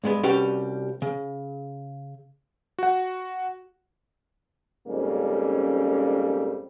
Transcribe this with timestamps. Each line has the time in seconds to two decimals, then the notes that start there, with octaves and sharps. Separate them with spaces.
0.04 G2 G#3 B3
0.23 C2 G3 C#4 F#4 G4 B4
1.02 C#3
2.79 F#4 F#5
4.87 F2 G#2 C#3 G3 A#3 C#4